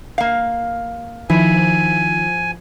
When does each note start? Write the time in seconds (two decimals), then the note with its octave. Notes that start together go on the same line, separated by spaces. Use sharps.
0.18 A#3 F5
1.30 D#3 F3 E4 G#5